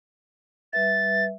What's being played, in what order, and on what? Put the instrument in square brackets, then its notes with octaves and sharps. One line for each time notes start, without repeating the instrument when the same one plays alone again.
[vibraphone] G3 B4 E5 [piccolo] A6